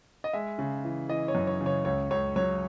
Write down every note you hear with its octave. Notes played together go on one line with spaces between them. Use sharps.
D#5
G#3 E5
C#3
E3
E3 D#5
C#5
F#2
C#5
C#3
C#5
C#2 C#5
C#2 C#5
F#3 C#5